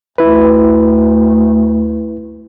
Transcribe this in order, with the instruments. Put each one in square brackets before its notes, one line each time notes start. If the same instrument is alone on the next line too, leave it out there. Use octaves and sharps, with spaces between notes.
[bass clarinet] D2 [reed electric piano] E4 B4